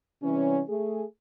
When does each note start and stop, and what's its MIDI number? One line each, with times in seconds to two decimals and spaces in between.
0.22 0.61 48
0.22 0.61 52
0.22 0.61 55
0.22 0.61 61
0.69 1.02 57
0.69 1.02 68